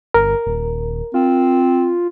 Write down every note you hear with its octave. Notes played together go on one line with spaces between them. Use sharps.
G1 A#4
D#1
C4 F4